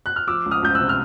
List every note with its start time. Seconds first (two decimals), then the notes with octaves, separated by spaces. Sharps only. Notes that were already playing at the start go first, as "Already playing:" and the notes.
0.06 F#6
0.16 F6
0.28 F3 D6 E6
0.46 C#2
0.51 D#6 F6
0.63 C#2 G6
0.75 E6 F#6
0.81 C3
0.89 F6